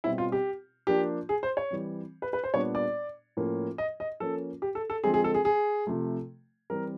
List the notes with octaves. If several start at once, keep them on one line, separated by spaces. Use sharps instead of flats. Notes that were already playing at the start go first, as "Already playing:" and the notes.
B2 G3 C4 E4
F4
G4
F3 A#3 D4 G4
G#4
C5
C#5
E3 G3 C4
B4
B4
C5
A#2 G3 B3 D4 C#5
D5
A2 F3 A#3 C#4
D#5
D#5
F3 A#3 C#4 A4
G4
A4
A4
D3 F3 G#3 C4 G#4
G#4
A4
G#4
G#4
C3 F3 A3
E3 G3 C4 A#4